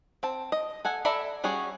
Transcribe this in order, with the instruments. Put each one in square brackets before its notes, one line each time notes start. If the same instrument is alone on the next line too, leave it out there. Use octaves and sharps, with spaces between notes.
[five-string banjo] C4 A5
D#5
A4 F#5 G#5
A4 D5 E5 A#5 B5
G3 C#4 F#4 G#4